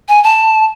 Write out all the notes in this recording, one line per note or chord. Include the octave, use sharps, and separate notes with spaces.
G#5
A5